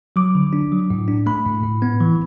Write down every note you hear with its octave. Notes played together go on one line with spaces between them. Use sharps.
F#3 D6
D3
D4
F#3
A2
D4
A3 B5
A2
A2
B3
E3